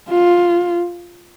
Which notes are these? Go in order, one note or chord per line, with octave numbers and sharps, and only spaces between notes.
F4